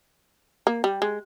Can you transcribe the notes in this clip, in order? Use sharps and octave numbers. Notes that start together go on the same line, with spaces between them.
A#3
G3
G#3